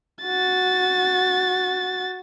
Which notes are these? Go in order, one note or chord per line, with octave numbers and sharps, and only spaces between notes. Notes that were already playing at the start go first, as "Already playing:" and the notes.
F#4 A6